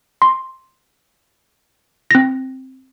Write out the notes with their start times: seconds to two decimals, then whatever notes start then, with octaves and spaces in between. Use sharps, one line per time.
0.22 C6
2.11 C4 A#6